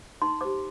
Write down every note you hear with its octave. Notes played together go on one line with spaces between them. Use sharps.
D#4 C6
G4 C5 D6